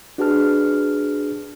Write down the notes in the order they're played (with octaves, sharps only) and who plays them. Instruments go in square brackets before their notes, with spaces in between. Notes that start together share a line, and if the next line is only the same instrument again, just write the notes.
[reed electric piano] D4 F#4 G#4 B4 A5 F6